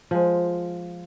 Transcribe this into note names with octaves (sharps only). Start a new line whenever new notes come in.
F3 G#3